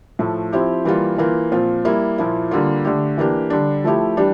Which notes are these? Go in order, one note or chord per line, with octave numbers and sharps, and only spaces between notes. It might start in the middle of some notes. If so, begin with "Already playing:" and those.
A2 F3 A3
F3 C4 E4 G4
E3 G3 A#3 F4
E3 A#3 F4
A#2 F3 C4 F4
G3 A#3 E4
A#2 F3 A#3 E4
D3 G3 A#3 F4
D3 A3 D4 G4
E3 A#3 D4 G4
D3 G3 D4
F3 A3 E4 G4
E3 G3 D4 G4